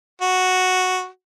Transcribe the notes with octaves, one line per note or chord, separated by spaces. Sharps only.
F#4